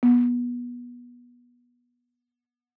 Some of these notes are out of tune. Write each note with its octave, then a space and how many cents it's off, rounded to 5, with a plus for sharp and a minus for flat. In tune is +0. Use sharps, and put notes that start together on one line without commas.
B3 -25